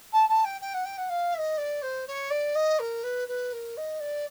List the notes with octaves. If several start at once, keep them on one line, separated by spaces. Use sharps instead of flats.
A5
A5
G5
G5
F#5
G5
F#5
F5
E5
D#5
D5
C5
C#5
D5
D#5
A#4
B4
B4
A#4
D#5
D5